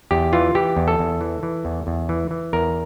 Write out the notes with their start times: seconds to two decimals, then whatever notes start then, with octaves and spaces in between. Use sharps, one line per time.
0.11 E2 G4
0.33 E3 F4
0.55 E3 G4
0.77 E2
0.88 A4
0.99 E2
1.21 E3
1.43 E3
1.65 E2
1.87 E2
2.09 E3
2.31 E3
2.53 E2 A#4